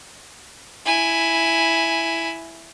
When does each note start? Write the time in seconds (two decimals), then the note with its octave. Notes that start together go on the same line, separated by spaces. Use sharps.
0.85 E4 G#5